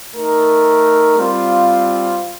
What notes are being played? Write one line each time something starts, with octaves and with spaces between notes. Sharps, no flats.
A3 D#4 A#4
G3 C4 F4 C5 F5